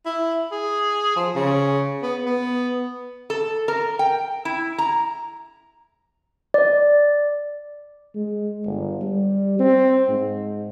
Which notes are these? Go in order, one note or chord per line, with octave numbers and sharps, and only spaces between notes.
E4
G#4
F3
C#3
B3
B3
A4
A#4
G5
E4
A#5
D5
G#3
G1
G3
C4
G#2